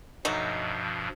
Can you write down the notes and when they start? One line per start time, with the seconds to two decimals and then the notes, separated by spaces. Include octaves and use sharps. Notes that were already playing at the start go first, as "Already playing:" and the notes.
0.25 G2 B2 F3 F#3 A3 D#4